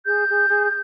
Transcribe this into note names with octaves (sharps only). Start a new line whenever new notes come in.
G#4 G6
G#4
G#4